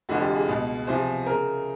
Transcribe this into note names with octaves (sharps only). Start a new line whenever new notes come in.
F1 F2 D3 F3 F#4
G4
G#4
C#2 B2
E2 C3 F3 C5
C#3 A#4